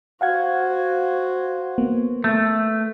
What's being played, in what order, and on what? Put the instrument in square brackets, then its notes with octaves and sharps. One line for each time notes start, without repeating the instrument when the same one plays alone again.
[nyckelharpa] F#4 C5 [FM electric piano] F5 F#5 G#6
[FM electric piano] A#3 B3
[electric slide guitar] A3